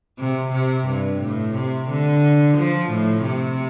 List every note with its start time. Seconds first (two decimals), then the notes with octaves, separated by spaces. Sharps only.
0.19 C3
0.53 C3
0.87 G2
1.21 A2
1.55 C3
1.89 D3
2.57 F3
2.91 A2
3.26 C3